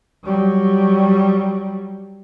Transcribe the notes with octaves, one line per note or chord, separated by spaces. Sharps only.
F#3 G3